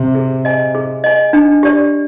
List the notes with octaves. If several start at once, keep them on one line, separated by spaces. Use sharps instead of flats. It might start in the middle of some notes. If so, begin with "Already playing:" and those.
Already playing: C3
G#4
D#5 G#5
G#4
D#5 G#5
D4
G4 D5